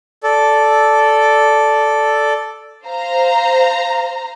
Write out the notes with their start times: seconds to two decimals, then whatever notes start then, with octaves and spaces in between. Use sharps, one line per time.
0.23 A4 D5
2.85 C5 F5 A#5